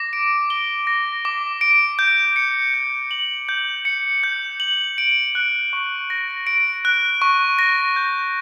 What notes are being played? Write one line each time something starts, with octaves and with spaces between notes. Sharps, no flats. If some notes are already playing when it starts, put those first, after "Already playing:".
Already playing: D6 A#6
D7
G7
A#6
D6
D7
G6
C#7
G6
F#7
G6
C#7
G6
F#7
D7
F#6
C#6
A#6
D7
F#6
C#6
A#6
G6